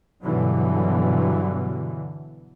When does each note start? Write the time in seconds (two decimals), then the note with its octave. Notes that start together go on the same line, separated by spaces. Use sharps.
0.22 G2 B2 D3 E3 F#3